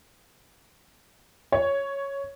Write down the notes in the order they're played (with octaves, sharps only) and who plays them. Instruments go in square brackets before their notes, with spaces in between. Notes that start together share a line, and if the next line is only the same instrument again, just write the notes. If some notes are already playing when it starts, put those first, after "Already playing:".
[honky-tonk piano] C#5